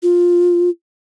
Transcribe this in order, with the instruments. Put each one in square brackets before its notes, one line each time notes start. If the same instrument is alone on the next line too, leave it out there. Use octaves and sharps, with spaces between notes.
[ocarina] F4